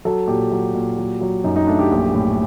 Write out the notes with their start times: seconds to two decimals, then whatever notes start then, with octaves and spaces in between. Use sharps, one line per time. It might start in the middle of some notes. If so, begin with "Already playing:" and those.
0.05 F#3 A4
0.28 A#2 G4
0.51 F#3
0.74 A#2
0.98 F#3
1.21 F#3
1.44 F#2 D#4
1.56 D#4
1.67 A3 D4
1.79 G4
1.91 A#1
2.14 A2